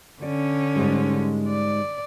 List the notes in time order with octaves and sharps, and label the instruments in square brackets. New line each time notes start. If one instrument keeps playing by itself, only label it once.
[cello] D3 C#4 [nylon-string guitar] D5
[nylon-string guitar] G#2 G3 G#3
[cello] D5